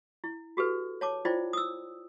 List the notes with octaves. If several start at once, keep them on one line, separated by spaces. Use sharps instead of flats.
E4
F#4 G4 A4 B4
C#5 A5 D6
E4 F4 C5 D5 G5
D#6 E6